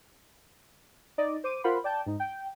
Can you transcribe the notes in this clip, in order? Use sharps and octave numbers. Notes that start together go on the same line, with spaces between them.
D#4 D5 D#5
C5 D6 D#7
F4 A#4 C5 F#5 B5 C6
D5 G5 A5 G6
G#2 D#4
G5